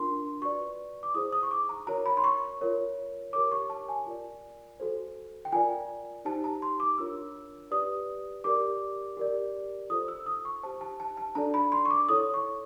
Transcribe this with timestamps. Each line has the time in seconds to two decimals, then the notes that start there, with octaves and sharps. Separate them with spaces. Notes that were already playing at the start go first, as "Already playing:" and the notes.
Already playing: D4 F4 A#4 C6
0.42 F#4 B4 D5 C#6
1.03 D6
1.14 E4 G#4 C5 D#6
1.32 D#6
1.43 C#6
1.51 D6
1.69 A#5
1.87 F#4 A#4 C#5 A#5
2.06 B5
2.17 C6
2.24 C#6
2.61 F4 A#4 C#5
3.33 G4 A#4 C#5 D6
3.51 C#6
3.70 A5
3.88 G#5
4.07 F4 A#4 D5
4.80 F#4 A4 C5
5.45 G5
5.52 F4 A#4 D5 G#5
6.25 D#4 G4 C5 A5
6.44 A#5
6.62 C6
6.80 D6
6.98 D4 F4 A#4 C#5 E6
7.71 G4 B4 D5 D#6
8.44 G4 A#4 D5 D6
9.17 G4 A#4 D5
9.90 F4 A4 C5 D#6
10.08 E6
10.26 D#6
10.45 C#6
10.63 G4 C5 A5
10.81 A5
11.00 A5
11.17 A5
11.35 D4 F#4 A4 D5 A#5
11.54 B5
11.72 C6
11.85 C#6
11.91 D6
12.09 E4 A4 C#5 D#6
12.34 C#6